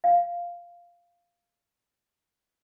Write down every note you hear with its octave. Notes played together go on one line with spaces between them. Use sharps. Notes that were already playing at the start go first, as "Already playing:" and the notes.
F5 G5